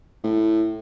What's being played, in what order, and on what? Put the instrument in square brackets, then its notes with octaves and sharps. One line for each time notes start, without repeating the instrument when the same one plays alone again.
[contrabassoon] A2